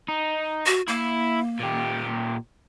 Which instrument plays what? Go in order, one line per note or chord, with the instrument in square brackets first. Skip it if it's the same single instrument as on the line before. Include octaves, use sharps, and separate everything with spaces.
[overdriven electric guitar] D#4
[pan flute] F#4
[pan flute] A#3 [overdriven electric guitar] E4
[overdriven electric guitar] A#2 G4